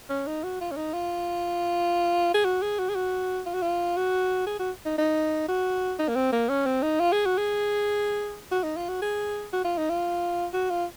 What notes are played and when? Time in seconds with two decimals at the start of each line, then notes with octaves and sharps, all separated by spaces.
0.10 C#4
0.27 D#4
0.44 F#4
0.61 F4
0.71 C#4
0.76 D#4
0.93 F4
2.34 G#4
2.45 F#4
2.62 G#4
2.79 F#4
2.89 G#4
2.95 F#4
3.46 F4
3.54 F#4
3.62 F4
3.97 F#4
4.47 G#4
4.59 F#4
4.85 D#4
4.98 D#4
5.48 F#4
5.99 D#4
6.08 A#3
6.16 C4
6.32 A#3
6.49 C#4
6.66 C4
6.83 D#4
7.00 F4
7.13 G#4
7.26 F#4
7.38 G#4
8.52 F#4
8.63 D#4
8.77 F4
8.89 F#4
9.02 G#4
9.53 F#4
9.65 F4
9.78 D#4
9.90 F4
10.53 F#4
10.70 F4